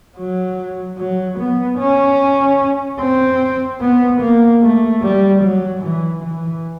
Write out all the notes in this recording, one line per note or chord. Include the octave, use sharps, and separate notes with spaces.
F#3
F#3
B3
C#4
C4
B3
A#3
A3
G3
F#3
E3
E3